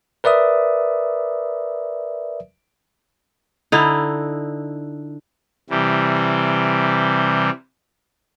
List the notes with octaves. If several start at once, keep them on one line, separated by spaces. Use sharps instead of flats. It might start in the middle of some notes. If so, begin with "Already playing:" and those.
A#4 B4 D5 E5 D#6
D3 D#4 E4
C3 E3 G3